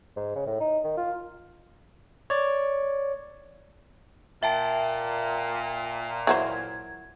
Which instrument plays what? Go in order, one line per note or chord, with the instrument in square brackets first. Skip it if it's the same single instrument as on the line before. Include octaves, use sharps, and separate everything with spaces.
[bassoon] G#2
C#3
A2
D#4
D#3
F4
[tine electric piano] C#5 D5
[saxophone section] A#2 [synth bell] E5 G5 A5
[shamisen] E3 F#3 C5 [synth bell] G#6